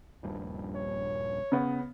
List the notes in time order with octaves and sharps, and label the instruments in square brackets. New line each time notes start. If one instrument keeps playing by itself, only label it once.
[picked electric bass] D#1 A#1 G2
[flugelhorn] C#5
[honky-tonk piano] C#3 B3